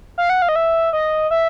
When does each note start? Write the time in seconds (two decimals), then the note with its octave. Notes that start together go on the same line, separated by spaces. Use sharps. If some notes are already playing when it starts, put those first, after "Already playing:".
0.18 F5
0.30 F#5
0.42 F5
0.49 D#5
0.56 E5
0.93 D#5
1.31 E5